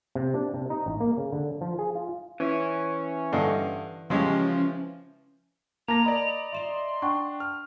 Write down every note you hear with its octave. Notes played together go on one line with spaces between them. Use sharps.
C3
D4
C3
D#4
A1
A#3
C#3
D3
F3
G#4
F4
E3 C#4
G2 D3 D#5
C#3 F3 G#3 C#4 G4
A#3 A5 A#5 A#6 F7
D5 D#5 A#5 B5
E5 C6 E7 F7
D4 F#5 G5 C#6
F6